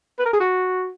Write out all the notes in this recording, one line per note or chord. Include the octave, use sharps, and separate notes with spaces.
B4
A#4
G#4
F#4